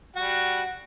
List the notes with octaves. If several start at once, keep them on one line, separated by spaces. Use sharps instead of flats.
G3 F#4 F#5